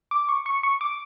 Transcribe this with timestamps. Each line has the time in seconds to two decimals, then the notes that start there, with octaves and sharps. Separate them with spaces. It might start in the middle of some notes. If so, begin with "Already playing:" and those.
0.11 D6
0.29 C#6
0.46 C#6
0.63 C#6
0.81 D6